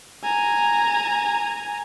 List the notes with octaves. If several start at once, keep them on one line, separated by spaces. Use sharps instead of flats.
G#5 A#5